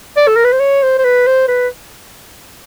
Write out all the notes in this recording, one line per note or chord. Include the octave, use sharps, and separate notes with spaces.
D5
A4
A#4
B4
C5
C#5
C5
C5
B4
C5
B4